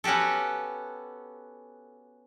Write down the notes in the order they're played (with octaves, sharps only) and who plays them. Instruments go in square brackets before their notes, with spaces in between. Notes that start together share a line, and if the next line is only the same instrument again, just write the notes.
[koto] B3 C#4 F#4 G4 A4